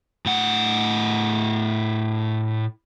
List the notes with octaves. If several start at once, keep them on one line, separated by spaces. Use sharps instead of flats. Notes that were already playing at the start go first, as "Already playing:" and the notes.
A2 F#5